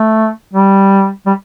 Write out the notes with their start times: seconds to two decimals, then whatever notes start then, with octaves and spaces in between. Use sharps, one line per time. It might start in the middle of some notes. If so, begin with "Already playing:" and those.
Already playing: A3
0.53 G3
1.26 G3